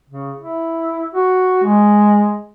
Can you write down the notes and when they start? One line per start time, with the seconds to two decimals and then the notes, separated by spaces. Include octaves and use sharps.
0.10 C#3
0.37 E4
1.15 F#4
1.64 G#3